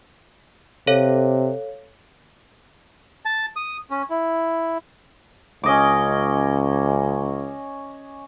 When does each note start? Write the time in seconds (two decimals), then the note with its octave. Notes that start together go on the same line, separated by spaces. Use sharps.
0.87 C3 A4 C#5 F5
3.25 A5
3.56 D#6
3.90 C#4
4.10 E4
5.64 C#2 C#4 D#5 D6